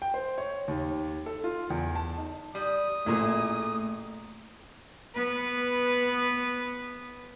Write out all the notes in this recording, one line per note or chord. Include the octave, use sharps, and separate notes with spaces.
G5
C5
C#5
D#2
A4
F4
E2
A5
D#4
G3 D#6
A1 A#2 A3 E4 G#4 A#4
B3 B4